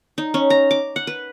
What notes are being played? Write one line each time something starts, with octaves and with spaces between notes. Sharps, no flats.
D#4
C#4
A#5
D6
F#5
B4